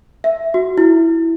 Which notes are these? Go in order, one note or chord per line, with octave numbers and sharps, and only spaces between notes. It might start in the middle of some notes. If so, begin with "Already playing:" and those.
E5
F#4
E4